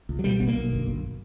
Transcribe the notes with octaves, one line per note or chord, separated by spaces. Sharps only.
C#2
F#3
B2 G3
B1 B3
A#3
B1
G1
G1